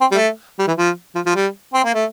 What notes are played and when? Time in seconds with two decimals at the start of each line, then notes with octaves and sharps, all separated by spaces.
0.01 C4
0.12 G3
0.15 A3
0.59 G3
0.68 E3
0.78 F3
1.15 F3
1.26 F3
1.35 G3
1.74 C4
1.84 A#3
1.94 A3